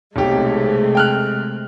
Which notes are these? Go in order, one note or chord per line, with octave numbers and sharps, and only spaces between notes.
B1 C3 G#3 A3 G4
G5 F6 F#6